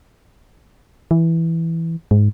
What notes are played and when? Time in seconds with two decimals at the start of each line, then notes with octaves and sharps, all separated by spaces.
1.11 E3
2.11 G#2